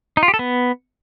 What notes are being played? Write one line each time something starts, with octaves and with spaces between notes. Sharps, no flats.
D#4
F4
G4
A4
B3